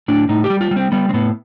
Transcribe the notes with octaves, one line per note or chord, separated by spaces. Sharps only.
A2 D4
A2 D#4
G4
G3
F4
G3
C4
G3 B3
C4
A2 B3